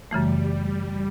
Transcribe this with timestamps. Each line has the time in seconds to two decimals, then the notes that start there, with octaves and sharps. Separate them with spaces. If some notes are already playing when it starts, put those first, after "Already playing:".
0.11 F#2 C#3 E3 G3 A3